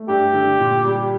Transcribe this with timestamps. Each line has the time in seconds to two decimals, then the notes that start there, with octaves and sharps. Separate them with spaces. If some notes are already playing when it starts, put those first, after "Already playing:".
Already playing: A3
0.08 G2 G4
0.33 D3
0.59 A#2
0.84 G3